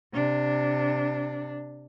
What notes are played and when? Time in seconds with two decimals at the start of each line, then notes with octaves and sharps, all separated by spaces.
0.14 C3 D4